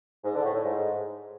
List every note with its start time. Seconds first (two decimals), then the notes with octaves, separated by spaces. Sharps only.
0.24 G#2
0.34 D3
0.44 A2
0.54 A2
0.64 G#2